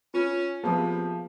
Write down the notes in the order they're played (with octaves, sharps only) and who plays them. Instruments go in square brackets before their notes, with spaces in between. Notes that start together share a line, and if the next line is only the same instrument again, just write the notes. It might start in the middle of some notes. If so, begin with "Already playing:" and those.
[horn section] C#4 [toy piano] F4
[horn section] C3 [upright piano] F3 [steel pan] A#3 B3 B4 [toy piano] G#4 D#6